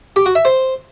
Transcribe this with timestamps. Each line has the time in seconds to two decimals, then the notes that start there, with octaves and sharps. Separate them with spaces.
0.16 G4
0.26 F#4
0.35 E5
0.45 C5